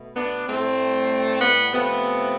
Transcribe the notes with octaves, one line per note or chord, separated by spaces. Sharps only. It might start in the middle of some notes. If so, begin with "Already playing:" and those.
Already playing: B2 A3
B3 D4
A2 G3 A3 C4
B3
C3 F3 A3 B3